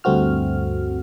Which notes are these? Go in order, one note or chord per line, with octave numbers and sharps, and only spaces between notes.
D2 G2 A3 C4 F#4 F6